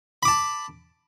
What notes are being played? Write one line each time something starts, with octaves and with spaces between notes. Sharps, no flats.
A5 B5 D6